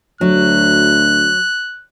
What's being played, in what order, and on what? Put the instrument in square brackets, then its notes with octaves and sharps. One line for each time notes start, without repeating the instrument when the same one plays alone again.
[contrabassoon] D2 [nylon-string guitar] F#3 [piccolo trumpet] F#6